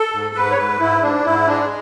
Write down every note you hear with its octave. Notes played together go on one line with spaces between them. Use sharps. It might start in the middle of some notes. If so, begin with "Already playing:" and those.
Already playing: A4
G#2
G#2 B4
C#5
G#2 B4
G#2 E4
G#2 D4
G#2 E4
G#3 D4